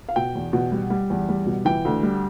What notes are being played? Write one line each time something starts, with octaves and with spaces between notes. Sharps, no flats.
F5
B2 G5
E2
B2
G3
G3
E2
G3
B2
E3 G5
D2
G3